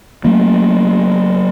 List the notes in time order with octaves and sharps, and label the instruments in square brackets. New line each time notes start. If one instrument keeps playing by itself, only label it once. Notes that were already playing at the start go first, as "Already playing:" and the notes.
[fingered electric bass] F#3 A3 A#3